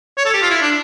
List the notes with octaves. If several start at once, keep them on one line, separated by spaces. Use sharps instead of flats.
C#5
A4
G4
F4
E4
D4